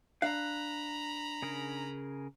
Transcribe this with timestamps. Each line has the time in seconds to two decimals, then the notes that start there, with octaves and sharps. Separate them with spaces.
0.22 D4 F5 A#5 B5 F#6
1.42 C#3 G#4 A#4